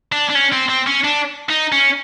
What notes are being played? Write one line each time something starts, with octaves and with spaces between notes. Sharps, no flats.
D4
D4
C#4
C4
C4
C#4
D4
D#4
C#4